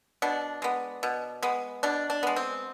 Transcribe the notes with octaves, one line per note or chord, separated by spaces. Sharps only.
B2 D4
G#3 B3
B2
G#3 B3
B2 D4
D4
G#3 B3
C4